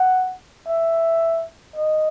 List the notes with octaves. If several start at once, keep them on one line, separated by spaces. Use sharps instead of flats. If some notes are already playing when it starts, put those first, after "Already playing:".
Already playing: F#5
E5
D#5